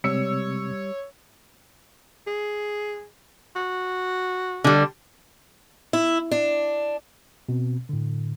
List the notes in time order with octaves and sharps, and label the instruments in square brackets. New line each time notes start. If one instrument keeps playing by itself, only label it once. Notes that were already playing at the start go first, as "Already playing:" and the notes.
[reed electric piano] C3 G#3 C4 [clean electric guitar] G3 [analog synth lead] C#5 [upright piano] E6 C#7
[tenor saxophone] G#4
F#4
[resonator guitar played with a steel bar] D3 G3
[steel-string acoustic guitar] E4
D4
[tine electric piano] B2 C4
A2 D3